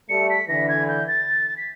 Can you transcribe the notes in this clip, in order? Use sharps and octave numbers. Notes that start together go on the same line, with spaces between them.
G3 A3 C#7
B6
D3 E3 A#6
G#6
G6
A6
B6